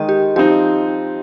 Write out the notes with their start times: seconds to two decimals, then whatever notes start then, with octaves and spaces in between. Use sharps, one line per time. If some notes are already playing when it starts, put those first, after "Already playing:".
Already playing: D#3 G#3 D#4 D#5
0.09 G4
0.36 F3 C4 D#4 G4